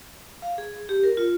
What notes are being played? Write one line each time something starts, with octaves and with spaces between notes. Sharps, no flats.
F5
G#4
G4
A#4
F4